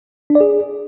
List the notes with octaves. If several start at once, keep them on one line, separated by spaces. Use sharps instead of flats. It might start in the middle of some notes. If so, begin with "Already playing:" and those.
D4
D5
G#4